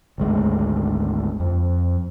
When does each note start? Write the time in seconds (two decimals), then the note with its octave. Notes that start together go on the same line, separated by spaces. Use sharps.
0.18 G#1 D2 G#3 A3
1.40 F2